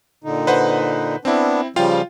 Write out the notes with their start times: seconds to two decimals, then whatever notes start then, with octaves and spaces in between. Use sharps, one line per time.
0.24 A#2 D3 D#4
0.47 B4 C5 F#5
1.25 B3 C4 D4 E4
1.76 C#3 F3 G3 F4 F5 G5